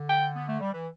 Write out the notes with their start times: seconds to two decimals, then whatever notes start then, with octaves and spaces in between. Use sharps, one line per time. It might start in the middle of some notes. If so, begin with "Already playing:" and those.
Already playing: D3
0.10 G5
0.36 B3
0.48 A3
0.60 G3
0.73 E3